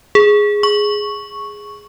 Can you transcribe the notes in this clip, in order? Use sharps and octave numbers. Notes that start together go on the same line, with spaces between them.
G#4
C#6